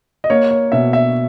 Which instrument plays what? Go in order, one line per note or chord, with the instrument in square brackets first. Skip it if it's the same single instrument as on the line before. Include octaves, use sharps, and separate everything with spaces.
[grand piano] D#5
A#3 C#5
C#5
B2 E5
E5